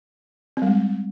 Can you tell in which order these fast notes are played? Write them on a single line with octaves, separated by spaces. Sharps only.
C4 G3 G#3